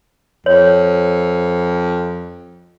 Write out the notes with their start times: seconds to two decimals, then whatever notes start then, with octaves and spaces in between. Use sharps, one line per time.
0.46 F2 C#5